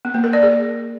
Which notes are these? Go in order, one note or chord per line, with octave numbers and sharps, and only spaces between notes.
B3
A#3
A#4
D5
G#4